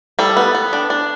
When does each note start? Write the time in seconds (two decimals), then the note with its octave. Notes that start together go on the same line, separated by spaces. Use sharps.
0.19 G3 A4
0.37 B3
0.55 B3
0.73 D4
0.90 D4